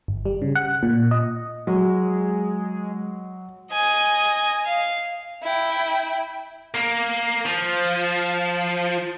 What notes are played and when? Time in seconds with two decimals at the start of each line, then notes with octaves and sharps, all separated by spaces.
0.08 G1
0.25 G3
0.42 C#3
0.55 F#5
0.83 A#2
1.11 D#5
1.67 F#3 G#3
3.72 D#5 G#5
4.65 F5
5.43 E4 G5
6.75 A#3
7.45 F3